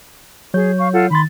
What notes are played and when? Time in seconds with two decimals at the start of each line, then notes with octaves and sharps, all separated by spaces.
0.54 F#3 G#4 C#5 G6
0.78 F5 C#6
0.93 F4 A4 F#5
1.11 D#3 B5 C6 A6